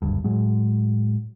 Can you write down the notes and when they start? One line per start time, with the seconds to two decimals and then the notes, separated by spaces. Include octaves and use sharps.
0.02 F#1 D2 G2
0.24 A2 F#3 G#3